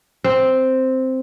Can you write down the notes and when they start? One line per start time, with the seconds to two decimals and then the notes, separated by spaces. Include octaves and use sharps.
0.24 C4